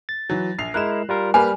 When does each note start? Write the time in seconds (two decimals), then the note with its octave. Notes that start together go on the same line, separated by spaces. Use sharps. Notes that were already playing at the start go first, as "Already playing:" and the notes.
0.09 A6
0.30 E3 F#3
0.58 A#1 C7 F7
0.74 G#3 E4 A#4 F#6 E7
1.09 G3 F4 A#4
1.34 G3 A#3 B4 G#5 B5 F6